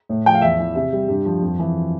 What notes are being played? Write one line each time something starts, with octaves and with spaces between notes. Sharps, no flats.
A2
F3 G5
F5
E2 E5
E3
C3 E5
G3
G2
F3
F2
E3